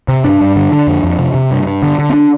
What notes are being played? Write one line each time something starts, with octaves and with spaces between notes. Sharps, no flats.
C3
G2 D4
G2
D3
D3
F2
F2
C3
C3
G2
G2
D3
D3
C4
D4